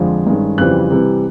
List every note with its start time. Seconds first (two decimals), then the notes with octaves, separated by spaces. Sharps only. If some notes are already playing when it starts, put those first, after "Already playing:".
Already playing: F2 D3 F3 G#3
0.27 G2 D#3 G#3 C#4
0.58 F2 C#3 E3 G3 C4 F#6
0.91 C3 E3 G3